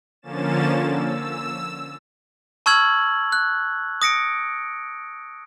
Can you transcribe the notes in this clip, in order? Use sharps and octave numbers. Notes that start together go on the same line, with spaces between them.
D3 F3 A#3 C#4 A6 E7
E6
A5 C#6 E6 F6 G#6 F#7
F#6
D#6 A#6 C#7 D7